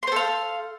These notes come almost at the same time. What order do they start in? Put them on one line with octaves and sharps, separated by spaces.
C6 C5 A4 F5